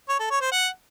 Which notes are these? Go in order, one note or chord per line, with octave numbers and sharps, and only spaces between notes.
C#5
A4
C#5
C5
F#5